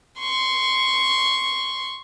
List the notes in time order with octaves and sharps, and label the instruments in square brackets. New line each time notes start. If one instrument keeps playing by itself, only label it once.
[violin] C6 C#6